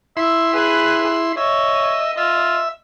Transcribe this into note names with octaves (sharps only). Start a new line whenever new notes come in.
E4 E5 C6
G#4 B4 F#6
C#5 D#5 E5
F4 E5